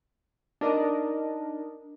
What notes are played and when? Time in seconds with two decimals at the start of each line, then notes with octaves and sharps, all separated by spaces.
0.61 D4 D#4 A#4 D#5